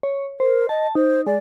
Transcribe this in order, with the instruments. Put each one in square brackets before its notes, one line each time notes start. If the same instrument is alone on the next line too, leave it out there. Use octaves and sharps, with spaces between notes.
[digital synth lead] C#5
[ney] A#4 [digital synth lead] C5
[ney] D#5 [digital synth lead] A5
[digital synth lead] D#4 [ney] C5
[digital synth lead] G#3 [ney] D5